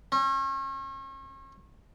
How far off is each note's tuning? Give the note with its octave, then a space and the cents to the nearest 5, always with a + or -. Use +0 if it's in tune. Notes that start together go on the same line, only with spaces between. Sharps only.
C#4 -40